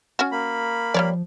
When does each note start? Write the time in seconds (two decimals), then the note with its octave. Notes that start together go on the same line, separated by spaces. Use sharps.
0.19 C#4 F#4
0.32 A#3 B5
0.94 F3 G3 C#5 D5